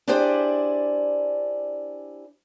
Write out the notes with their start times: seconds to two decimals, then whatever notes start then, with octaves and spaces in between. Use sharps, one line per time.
0.08 D4 E4 G4 G#4 C5 D5